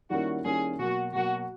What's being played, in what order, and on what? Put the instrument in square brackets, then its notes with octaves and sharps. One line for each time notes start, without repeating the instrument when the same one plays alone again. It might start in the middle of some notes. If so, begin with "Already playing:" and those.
[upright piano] D#3 G3 A#3 C#4 E4 [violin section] F#4
[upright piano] D#3 G3 A#3 C#4 E4 [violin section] G#4
[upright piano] B2 F#3 A#3 [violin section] F#4
[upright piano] B2 F#3 A#3 [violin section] F#4